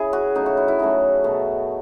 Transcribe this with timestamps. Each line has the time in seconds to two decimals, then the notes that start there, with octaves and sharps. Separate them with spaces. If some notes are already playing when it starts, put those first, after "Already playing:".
Already playing: C#3 E4 G#4
0.13 F#4
0.35 C#3 F#3 A3 D#4
0.46 F#4
0.57 E4
0.68 E4
0.79 C#3 F#3 A3 D#4
1.24 B2 A3